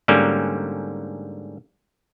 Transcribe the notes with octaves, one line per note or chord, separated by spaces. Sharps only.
G#2 D3 G3 A#3 C#4